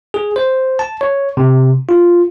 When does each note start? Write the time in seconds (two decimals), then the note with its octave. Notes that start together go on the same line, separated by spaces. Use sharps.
0.14 G#4
0.36 C5
0.79 A5
1.01 C#5
1.37 C3
1.89 F4